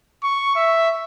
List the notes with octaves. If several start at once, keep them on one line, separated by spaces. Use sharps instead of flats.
C#6
E5